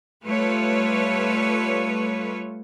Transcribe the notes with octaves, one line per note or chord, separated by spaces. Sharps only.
G3 A3 F4 A4 B4 C#5